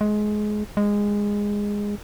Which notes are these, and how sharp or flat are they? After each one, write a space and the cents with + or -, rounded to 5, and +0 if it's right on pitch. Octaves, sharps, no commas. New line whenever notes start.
G#3 +20
G#3 -15